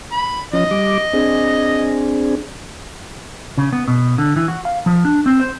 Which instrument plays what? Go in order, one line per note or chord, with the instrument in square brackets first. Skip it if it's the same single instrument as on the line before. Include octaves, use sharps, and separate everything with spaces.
[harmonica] B5
[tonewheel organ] F3 C#4 [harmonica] D#5
[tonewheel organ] G3 D6
C4 D4 G#4
[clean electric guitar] C#3
B3
B2
D3
E3
F#4
F5
F3
D4
C4
C5